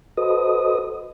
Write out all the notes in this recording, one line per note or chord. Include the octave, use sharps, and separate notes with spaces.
F#4 A4 B4 C5 D#5 D#6